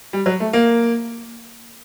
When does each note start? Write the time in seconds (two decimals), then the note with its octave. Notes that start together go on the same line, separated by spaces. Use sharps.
0.13 G3
0.26 F#3
0.40 A3
0.53 A#3